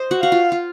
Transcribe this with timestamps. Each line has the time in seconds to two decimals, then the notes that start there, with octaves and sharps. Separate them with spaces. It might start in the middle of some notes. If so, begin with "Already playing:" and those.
Already playing: C5 D#5
0.11 F#4
0.21 F#4 F5
0.32 F4
0.52 F4